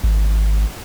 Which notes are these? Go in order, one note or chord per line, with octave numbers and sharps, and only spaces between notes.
G#1